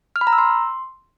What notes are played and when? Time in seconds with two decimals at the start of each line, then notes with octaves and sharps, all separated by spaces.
0.16 F6
0.21 B5
0.27 A#5
0.33 E6
0.38 C6